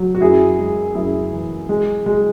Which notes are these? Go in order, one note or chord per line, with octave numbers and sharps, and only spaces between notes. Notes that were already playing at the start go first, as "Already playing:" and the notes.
Already playing: F#3
F#4
F#2 E4 G#4
G#3
F#2 E4 G#4
E3
G#3
G#3